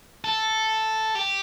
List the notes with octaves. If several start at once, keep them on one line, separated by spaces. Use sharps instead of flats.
A4
G4